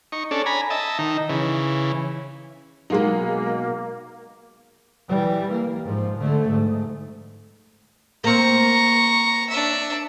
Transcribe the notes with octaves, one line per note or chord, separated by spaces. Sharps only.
D#4 C#6
C#4 D4 A4
G#5 A#5 B5
D#5 E5 A5
D#3 D#4
C#3 E3
B2 F#3 G#3 A#3 D#4
E3 G3
A#3
G#2 F3
D3 A3
G#2
A#3 C4 A#5 C#6
D4 E5